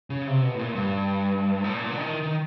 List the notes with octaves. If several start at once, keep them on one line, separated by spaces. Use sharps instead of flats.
C#3
C3
B2
A2
A#2
G2
A2
A#2
D3
D#3
D#3